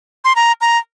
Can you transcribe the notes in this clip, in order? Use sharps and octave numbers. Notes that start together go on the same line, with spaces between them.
C6
A#5
A#5